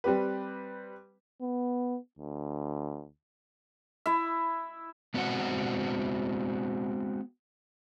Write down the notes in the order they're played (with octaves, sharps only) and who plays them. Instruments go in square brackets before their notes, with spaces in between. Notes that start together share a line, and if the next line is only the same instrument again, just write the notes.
[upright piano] G3 C4 G4 B4
[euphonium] B3
D2
[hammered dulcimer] E4 E5
[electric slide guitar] G#3 B3 C4 F#4 F#5